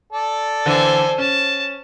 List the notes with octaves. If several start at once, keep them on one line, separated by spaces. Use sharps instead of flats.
A4 D5
D3 E3 C5 G#5
C#4 A5